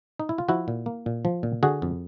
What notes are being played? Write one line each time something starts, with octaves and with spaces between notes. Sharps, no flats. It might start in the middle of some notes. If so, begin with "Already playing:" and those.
D#4
E4
F4
F3 E4 F#4
A#2
A#3
A#2
F3
A#2
D3 F#4 G#4
F2